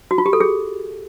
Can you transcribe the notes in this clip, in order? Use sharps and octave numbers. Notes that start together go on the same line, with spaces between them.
F#4
F4
G4
A4
G#4